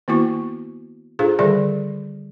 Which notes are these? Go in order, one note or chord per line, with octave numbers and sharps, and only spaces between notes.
D#3 A#3 B3 E4 F#4 C#6
D4 F4 G#4 A4 C5 F5
D3 D#3 G3 G#4 A4 D5